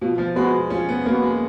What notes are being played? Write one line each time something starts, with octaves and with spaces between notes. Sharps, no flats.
B2 F3
F3
G#3 B3 F#4
F3 C#4
B3
A#3 B3 F#4
G#3